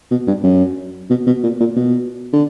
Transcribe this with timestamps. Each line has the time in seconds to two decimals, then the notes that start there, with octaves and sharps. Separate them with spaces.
0.11 B2
0.27 G2
0.43 F#2
1.10 B2
1.26 B2
1.43 A#2
1.60 A#2
1.76 B2
2.33 D3